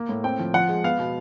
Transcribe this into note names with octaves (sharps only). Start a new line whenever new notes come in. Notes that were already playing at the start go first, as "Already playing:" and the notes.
Already playing: A#3
A2
C4 G5
F3
F3 F#5
G#3
B3 F5
B2